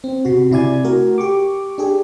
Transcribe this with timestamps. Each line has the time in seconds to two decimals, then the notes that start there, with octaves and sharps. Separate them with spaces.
0.04 C4
0.25 C3 F#4
0.51 C3 E4 D5 G#5 G#6
0.84 A3 F#4 A#4
1.18 G4 C#6 D6
1.78 D4 G4 G#4